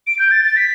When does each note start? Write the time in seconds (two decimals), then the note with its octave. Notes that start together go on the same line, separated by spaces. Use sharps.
0.07 D7
0.19 G6
0.31 A6
0.45 A6
0.56 B6